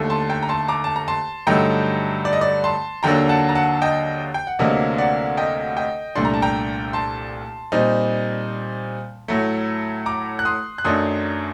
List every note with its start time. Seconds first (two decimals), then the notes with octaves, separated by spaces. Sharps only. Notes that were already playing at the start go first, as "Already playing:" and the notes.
Already playing: D#2 D3 A3
0.10 A5 C6
0.29 G5 A#5
0.43 A#5
0.49 A5 C6
0.68 A#5 D6
0.84 A5
0.96 A#5
1.08 A5 C6
1.47 G2 D3 F#3 A3 D#4 G5 A#5
2.25 D5
2.33 D#5
2.41 D5
2.64 A5 C6
3.03 D#2 D3 F#3 A#3 D4 G5 A#5
3.29 F#5 A5
3.49 A#5
3.55 F#5 A5
3.81 D#5 G5
4.34 G5
4.47 F#5
4.59 D2 C3 F#3 A#3 D4 D#5
4.98 D5 F#5
5.37 D#5 G5
5.76 D#5 G5
6.15 C2 A#2 A3 D4 C6
6.25 A#5
6.34 A5
6.42 G5 A#5
6.93 A5 C6
7.72 A#2 G3 C4 D#4
9.28 A2 F#3 A3
10.06 A#5 D6
10.39 F#6
10.45 C6 D#6
10.78 F#6
10.84 F#2 D#3 F#3 A3 D4 C6 D#6